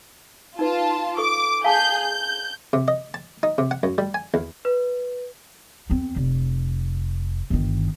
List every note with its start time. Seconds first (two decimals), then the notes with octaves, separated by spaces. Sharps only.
0.59 D#4 F4 B4 A5
1.17 A4 C#6 D6
1.64 G#4 F5 G#5 A5 G6
2.00 G6
2.73 C3
2.88 D#5
3.14 A5
3.43 D#4
3.58 C3
3.71 F#5
3.83 F#2
3.98 G3
4.14 G#5
4.34 E2
4.65 B4
5.90 E2 C4
6.16 F1
7.50 G1 D#3